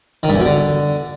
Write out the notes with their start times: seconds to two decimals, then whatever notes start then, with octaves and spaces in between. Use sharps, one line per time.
0.23 D#3
0.29 G2
0.34 E2
0.40 B2
0.45 D3